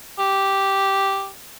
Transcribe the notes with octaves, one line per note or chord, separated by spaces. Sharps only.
G4